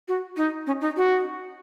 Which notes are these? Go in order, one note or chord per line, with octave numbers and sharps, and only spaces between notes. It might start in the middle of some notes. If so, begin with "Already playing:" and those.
F#4
D#4
C#4
D#4
F#4